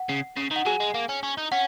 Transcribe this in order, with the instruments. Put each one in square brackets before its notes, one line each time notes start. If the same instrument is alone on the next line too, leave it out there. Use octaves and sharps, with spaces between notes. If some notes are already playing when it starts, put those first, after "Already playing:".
Already playing: [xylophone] F#5
[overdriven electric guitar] C#3
C#3
[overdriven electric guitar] D#3 [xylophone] F#5
[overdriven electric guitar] F#3 [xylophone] G#4 G#5
[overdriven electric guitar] G#3
A#3
C#4
C#4
D#4
[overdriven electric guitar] C#4 [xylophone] F#5